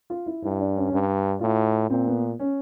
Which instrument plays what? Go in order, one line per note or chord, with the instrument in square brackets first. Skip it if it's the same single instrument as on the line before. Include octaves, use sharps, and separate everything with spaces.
[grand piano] F4
E4
[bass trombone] G2 [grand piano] E4
[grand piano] D4
C#4
C#4
[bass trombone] G2 [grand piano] D4
[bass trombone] A2 [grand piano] F4
[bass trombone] A#2 [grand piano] C4
[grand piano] B3
C#4